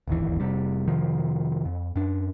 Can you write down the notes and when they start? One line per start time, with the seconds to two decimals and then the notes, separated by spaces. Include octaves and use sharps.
0.08 D1 G1 D#2 E3
0.40 F1 C3 G3
0.88 F2 C3 D#3 F3
1.65 F2
1.96 F#2 D4